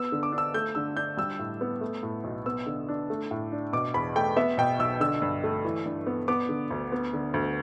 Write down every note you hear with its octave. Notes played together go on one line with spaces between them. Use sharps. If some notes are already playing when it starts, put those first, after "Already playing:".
Already playing: B3 E6
D3
D6
D4
E6
A3 G6
D3 E6
D4 G6
G3 E6
A2
B3
A3
A2
B1
B3 E6
D3
D4
A3
A2
D4
B2 D6
E2 B5
A3 G5
B3 E5
B2 G5
B1 E6
D3 E6
G2
A3
E3
G2
B3
B3 D6
D3
D2
B3
D3
D2